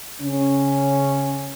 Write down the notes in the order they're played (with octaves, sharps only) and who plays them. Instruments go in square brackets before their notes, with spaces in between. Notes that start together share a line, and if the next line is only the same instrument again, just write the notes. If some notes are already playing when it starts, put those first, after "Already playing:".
[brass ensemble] C#3 C#4